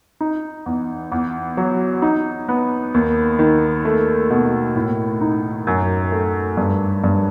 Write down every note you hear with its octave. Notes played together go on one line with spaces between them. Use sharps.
D#4
E2
E2
F#3
D#4
B3
D#2
D#3
A3
B2
A2
D#4
F#2
A3
G2
G2